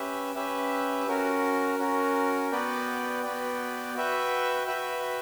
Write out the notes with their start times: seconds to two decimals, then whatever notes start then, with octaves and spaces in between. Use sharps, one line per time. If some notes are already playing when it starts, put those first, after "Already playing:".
Already playing: C#4 G4 B4 E5
0.35 C#4 G4 B4 E5
1.07 C#4 F#4 A#4
1.79 C#4 F#4 A#4
2.52 B3 F#4 B4 D5 G5
3.23 B3 F#4 B4 D5 G5
3.95 F#4 B4 E5 G5
4.67 F#4 B4 E5 G5